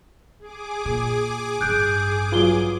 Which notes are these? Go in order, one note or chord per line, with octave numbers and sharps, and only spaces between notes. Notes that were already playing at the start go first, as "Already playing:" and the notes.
G#4 D6
A#2
A1 G2 F#6 G6 D7
F#3 F4 B4 G7